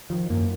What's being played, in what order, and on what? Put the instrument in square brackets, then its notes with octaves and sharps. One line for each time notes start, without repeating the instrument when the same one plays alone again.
[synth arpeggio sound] D#3 [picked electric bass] F3
[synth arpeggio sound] F#2 [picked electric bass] A#3